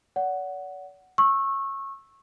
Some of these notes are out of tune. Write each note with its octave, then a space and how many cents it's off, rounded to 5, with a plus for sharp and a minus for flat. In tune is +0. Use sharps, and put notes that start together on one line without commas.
D5 -45 F#5 +5
C#6 -20 E6 +0